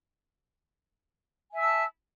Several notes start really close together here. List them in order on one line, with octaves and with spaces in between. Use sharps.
G#5 E5 E6 A5